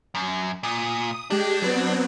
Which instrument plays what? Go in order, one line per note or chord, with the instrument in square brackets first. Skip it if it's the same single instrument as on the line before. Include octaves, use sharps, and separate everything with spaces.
[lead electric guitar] F#2
[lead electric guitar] A#2 [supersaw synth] D#6
[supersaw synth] G#3 G4 [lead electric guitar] D4
[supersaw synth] F#3 B3 C4